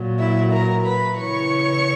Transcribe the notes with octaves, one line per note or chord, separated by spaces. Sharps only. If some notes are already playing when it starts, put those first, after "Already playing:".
Already playing: A#2 F#3
E4 E5
A#4 A#5
B4 B5
C#3 E3 C#5 C#6